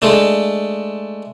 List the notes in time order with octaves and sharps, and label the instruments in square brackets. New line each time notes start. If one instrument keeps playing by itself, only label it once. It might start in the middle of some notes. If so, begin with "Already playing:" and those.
[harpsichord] G#3 A3 D4